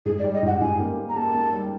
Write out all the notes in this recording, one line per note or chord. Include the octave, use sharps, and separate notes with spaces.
G#2 G#4
D5
G3
D#5
G#2 F#5
G#2 G#5
A#3
A#3
A#5
A#3 A5
A#3
G3